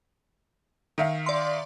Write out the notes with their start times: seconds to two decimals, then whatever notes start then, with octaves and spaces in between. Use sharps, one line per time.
0.98 D#3 E5 F5
1.26 D5 C6